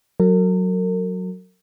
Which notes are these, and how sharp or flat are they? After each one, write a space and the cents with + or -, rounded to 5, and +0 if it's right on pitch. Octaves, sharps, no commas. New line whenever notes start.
F#3 +0 A#4 -40